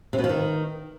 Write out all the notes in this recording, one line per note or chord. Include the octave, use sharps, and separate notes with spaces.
C3
B2
F3
D#3